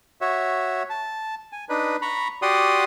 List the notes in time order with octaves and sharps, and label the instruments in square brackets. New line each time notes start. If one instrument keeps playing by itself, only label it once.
[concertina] F#4 C#5 E5
A5
G#5
D4 D#4 B4
A#5 B5 C#6
F#4 G4 D5 F#5 C6 D#6